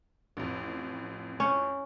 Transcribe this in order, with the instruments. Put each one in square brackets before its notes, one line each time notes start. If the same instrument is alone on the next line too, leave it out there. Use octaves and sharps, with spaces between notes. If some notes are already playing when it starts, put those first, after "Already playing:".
[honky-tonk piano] A1 F2
[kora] C#4